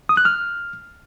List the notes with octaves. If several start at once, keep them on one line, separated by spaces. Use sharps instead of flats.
D#6
F#6
F6